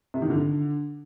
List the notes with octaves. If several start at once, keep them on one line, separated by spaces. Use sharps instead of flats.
C3
D#3
D3